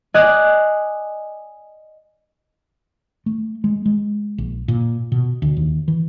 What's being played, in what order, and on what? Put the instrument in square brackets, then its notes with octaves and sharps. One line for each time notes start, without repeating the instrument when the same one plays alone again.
[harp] D5 D#5 G#5 F#6
[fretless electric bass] A3
G#3
G#3
A#1
A#2
B2
D2
D#2
E3